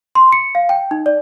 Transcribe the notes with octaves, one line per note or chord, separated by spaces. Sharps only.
C6
C#7
F5
G5
D#4
D5